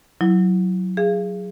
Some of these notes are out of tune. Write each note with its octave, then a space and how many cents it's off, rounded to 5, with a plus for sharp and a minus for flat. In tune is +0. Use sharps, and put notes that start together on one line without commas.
F#3 +0 E4 +5
G#4 -10 F5 -35